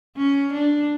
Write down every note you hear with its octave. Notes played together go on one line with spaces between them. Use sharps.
C#4
D4